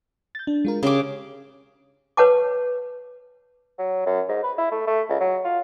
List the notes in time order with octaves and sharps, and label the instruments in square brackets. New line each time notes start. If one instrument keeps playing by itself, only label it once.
[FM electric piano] G6 A6
D4
G#3 F4 A#4
[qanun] C#3 D6 [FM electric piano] C#4 G4
[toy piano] B4 C#5 F#5 A5 D6
[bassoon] F#3
F#2
G#2
B4
E4
A3
A3
C#2
F#3
F4